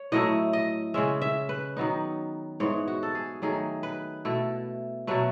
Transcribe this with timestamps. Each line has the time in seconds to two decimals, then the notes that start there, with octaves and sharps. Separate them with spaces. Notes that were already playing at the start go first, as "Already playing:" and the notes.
Already playing: C#5
0.12 A2 F#3 A3 E4 D#5
0.53 D#5
0.94 C#3 G#3 C#4 E5
1.22 E5
1.49 B4
1.77 D#3 F#3 B3 D#4
2.60 G#2 E3 B3 C#5
2.88 F#4
3.03 A4
3.15 G#4
3.42 D#3 F#3 A3 G#4
3.83 B4
4.25 B2 A3 E4
5.07 B2 F#3 A3 B4